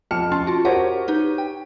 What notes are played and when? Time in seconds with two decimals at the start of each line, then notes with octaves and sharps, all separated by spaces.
0.11 F2 A5 F6 C#7
0.32 C#4 A5 C6
0.47 F4 F#4
0.65 F#4 G4 A#4 C5 C#5 F#5
1.08 D#4 G4 B4
1.38 G5